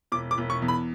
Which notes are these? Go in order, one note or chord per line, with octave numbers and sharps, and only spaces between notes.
E1 D6
D6
E1
C#6
E2
B5